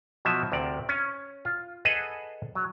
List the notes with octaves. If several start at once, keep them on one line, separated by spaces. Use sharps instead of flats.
B2 F3 F#3 E5
D2 C3 A#4 D5
C#4
F4
G#4 A4 B4 D#5 F#5
F#3